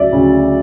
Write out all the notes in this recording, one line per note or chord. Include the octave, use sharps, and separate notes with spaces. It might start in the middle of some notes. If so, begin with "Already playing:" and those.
Already playing: D2 C#3 F#3 D5 E5
D2 C#3 F#3